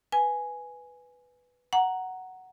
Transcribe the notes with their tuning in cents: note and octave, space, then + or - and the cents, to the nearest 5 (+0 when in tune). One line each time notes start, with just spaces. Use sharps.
B4 +0 G#5 +5
F#5 +5 A#5 +0